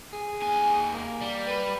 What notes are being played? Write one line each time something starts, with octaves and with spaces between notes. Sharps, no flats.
G#4
D#2 G#5
A#3
G3
B4